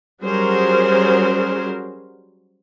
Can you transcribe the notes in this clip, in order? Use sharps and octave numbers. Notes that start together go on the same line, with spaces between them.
F#3 G3 C#4 G#4 A#4 C5